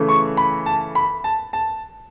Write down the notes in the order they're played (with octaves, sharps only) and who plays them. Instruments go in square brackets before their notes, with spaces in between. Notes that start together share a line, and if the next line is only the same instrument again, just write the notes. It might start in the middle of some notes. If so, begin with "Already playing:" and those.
Already playing: [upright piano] C#3 E3 A3
C#6
B5
A5
B5
A5
A5